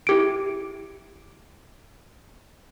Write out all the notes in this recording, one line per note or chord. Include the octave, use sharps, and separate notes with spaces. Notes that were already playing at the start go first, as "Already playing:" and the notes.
E4 G4 D7